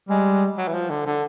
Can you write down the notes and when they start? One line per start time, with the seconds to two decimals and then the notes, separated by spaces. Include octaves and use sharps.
0.09 G3 G#3
0.58 F#3
0.68 E3
0.74 F3
0.90 D3
1.06 D3